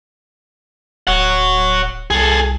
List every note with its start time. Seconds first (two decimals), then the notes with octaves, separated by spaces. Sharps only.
1.07 D1 C#5 F#5
2.10 C2 G#4 A4